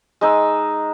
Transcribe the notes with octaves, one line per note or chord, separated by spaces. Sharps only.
G#3 D#4 E6